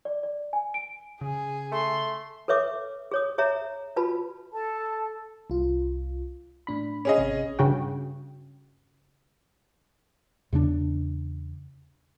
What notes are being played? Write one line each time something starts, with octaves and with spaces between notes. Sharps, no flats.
D5
D5
G#5
D7
C#3 G#4
A3 C6
A4 B4 C#5 E5 D6
G#4 C#5 D#6
G#4 C#5 E5 A#5
F4 F#4 B4 A5 B5
A4 A5
C2 F4
A2 D4 B5
C#4 G#4 D#5
G#1 C3
G2 C#3 F#4 G5
E2 C#3 A3 D4